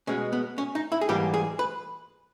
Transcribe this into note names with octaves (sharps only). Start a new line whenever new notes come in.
B2 G#3 B3 C#4
B3
C#4
D#4
E4
G#4
G#2 E3 G3 A#3 G4
G#4
B4